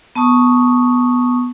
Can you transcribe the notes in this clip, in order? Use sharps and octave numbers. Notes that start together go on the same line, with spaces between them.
B3 A5 C#6 D#6